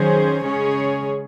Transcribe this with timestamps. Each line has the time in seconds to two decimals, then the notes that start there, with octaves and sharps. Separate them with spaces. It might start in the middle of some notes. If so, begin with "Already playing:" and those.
Already playing: D#3 F#3 C#4 G#4 C5
0.44 C#3 G#3 C#4 G#4 C#5